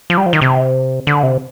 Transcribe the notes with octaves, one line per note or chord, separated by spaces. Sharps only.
F3
G3
F3
D#3
C3
D3
C3